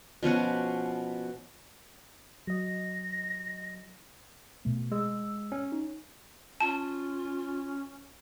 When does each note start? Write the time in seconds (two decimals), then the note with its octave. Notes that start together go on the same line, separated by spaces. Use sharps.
0.23 B2 F3 C#4 F#4
2.47 F#3 D#5 A#6
4.65 B2 A3
4.92 G#3 E6
5.52 C#4
5.72 D#4
6.60 C#4 F4 A5